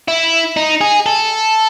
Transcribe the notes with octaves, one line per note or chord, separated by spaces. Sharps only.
E4
D#4
G#4
A4